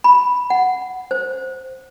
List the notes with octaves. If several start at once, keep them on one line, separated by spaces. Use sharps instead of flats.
B5
F#5
C5